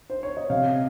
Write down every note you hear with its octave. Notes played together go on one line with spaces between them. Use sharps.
C5
C#5
D#5
C3 F5